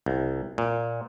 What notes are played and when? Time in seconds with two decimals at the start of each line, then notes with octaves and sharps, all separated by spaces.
0.06 C2
0.58 A#2